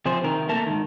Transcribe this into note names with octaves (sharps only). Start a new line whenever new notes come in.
C3 F3 G#4 C5
C3 D#3 A#4
A3 A#3 A#4 A5
G#2 D#3